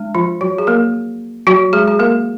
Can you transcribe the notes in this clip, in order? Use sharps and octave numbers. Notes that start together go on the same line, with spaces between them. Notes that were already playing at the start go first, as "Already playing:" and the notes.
Already playing: G#3 D4
F3 F4
F#3 F#4
G#4
A#3 A#4
F#3 F#4
G#3 G#4
G#4
A#3 A#4